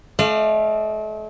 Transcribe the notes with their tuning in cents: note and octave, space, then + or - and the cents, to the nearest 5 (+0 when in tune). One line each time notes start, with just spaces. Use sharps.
A3 -40 D5 +40 F5 -25